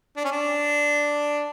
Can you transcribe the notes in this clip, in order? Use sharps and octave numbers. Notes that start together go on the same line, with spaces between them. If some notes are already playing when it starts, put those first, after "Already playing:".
D4
C#4
D4